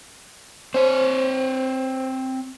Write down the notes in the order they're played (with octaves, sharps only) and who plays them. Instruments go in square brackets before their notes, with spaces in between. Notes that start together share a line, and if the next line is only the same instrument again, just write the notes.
[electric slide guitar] C4 C#5 [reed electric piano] C5